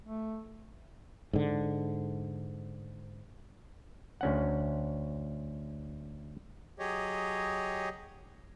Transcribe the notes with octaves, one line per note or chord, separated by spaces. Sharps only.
A3
G#2 D3
D2 C#4 F#5
F#3 G4 G#4 C#5 D#5